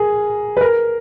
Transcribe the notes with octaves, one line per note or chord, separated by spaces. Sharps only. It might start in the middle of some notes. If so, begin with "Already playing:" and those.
Already playing: G#4 A#4
B4
A#4